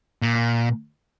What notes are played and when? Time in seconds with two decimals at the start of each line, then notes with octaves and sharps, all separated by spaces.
0.22 A#2